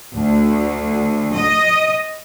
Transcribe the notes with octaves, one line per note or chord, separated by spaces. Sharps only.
D2
D#5